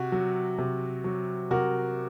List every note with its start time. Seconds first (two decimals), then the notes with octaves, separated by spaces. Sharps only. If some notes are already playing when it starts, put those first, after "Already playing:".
Already playing: C3 F#4
0.12 F#3
0.58 C3
1.04 F#3
1.51 C3 F#4 A#4